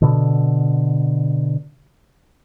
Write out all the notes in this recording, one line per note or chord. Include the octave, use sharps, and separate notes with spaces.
B2 D3